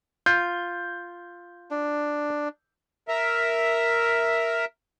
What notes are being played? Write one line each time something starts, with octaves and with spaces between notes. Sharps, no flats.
F4 G6
D4
A#4 E5